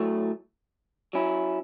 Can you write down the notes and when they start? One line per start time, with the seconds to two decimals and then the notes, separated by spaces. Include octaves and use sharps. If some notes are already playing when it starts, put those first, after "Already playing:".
Already playing: A2 F#3 A3
1.13 F#3 C#4 E4